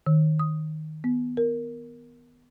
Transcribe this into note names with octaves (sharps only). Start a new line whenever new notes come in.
D#3
D#6
B3
A#4